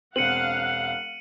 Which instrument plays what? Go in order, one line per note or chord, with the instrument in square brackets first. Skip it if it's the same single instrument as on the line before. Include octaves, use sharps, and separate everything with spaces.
[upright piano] E1 C4 [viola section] F5 F#5 [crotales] C#7 D#7 F#7